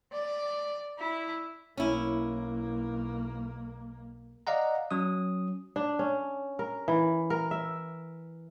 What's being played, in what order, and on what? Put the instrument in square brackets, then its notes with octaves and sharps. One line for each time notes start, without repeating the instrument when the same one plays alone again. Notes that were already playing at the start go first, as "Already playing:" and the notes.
[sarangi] D5
E4
[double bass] B1 A#3 [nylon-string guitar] C#4 E4
[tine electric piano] D5 D#5 F5 F#5 A#5
F#3 C#4 D#6
[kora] D4
C#4
A#4
E3
A#4
E5